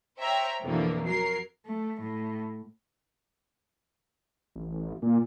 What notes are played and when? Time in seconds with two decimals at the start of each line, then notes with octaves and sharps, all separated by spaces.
0.19 C5 C#5 E5 G5 A#5
0.63 F2 B2 D3 E3 A#3
1.06 F#3 A#4 C7
1.66 A3
2.01 A2
4.56 A1
5.02 A#2